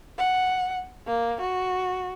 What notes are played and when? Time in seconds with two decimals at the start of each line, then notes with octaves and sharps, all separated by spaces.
0.18 F#5
1.07 A#3
1.41 F#4